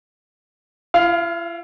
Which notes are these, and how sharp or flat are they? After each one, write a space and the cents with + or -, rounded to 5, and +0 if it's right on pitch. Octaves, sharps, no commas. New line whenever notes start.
E4 +45 F5 +0